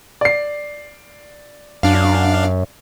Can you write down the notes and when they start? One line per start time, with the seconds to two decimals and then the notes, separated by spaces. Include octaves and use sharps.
0.21 D5 C7
1.83 F#2 D4 F5